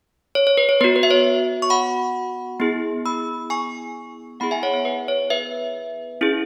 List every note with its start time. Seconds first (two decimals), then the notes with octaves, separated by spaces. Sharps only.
0.35 C#5
0.47 C#5
0.57 B4
0.69 C#5
0.81 B3 F#4 B4
0.96 B4
1.03 E5
1.11 C#5
1.62 C#6
1.70 F#5 B5
2.60 B3 E4 G#4
3.06 B5 E6
3.50 G#5 C#6
4.40 B3 E4 G#4 F#5 B5
4.51 E5 G#5
4.63 C#5 F#5
4.74 C#5
4.85 B4
5.08 C#5
5.30 B4 E5
6.21 C#4 E4 G#4